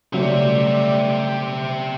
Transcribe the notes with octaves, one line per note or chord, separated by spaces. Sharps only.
C#3 F#3 G3 A3 G4 E5